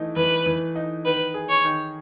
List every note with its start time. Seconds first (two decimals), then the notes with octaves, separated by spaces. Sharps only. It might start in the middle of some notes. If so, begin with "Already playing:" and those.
Already playing: E3 A3 D#4
0.16 E3 B4
0.46 E3
0.75 D#4
1.05 D#3 B4
1.34 G#4
1.49 C#5
1.65 D#3